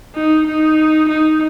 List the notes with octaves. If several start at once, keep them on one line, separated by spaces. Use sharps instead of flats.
D#4
D#4
D#4